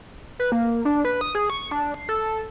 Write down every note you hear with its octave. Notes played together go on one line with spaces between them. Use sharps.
B4
A#3
D4
B4
D#6
G#4
C#6
D4
C7
A4